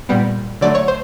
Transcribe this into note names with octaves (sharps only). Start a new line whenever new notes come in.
A#2 G3 B3
D3 F#3 A3 D5
C#5
C5